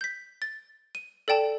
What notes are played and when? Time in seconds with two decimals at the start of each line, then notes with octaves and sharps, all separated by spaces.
0.01 G6 B6
0.42 A6
0.95 D#7
1.28 A4 D5 G5 A5